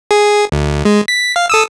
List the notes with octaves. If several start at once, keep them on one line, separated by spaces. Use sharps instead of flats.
G#4
D2
G#3
B6
F5
A4 D#6 E6